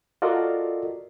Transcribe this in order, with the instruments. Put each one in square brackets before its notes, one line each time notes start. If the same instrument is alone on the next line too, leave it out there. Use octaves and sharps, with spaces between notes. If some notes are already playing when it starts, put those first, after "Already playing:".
[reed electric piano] F4 F#4 A4 A#4 D5 D#5